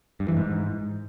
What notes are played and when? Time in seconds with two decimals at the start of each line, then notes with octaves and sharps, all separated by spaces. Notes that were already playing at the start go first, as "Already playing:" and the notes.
0.20 G2
0.28 E3
0.37 G#2